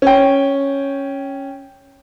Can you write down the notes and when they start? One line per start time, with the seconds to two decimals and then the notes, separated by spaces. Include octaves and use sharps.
0.02 C#4 G5